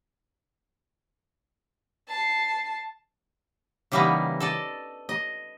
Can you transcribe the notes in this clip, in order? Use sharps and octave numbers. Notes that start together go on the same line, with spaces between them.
A5 C7
C#3 E3 G3 A#3 B3 D#4
A4 D5 D#5
D#5